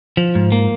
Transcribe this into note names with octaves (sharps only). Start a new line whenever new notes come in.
F3
G#2
A#3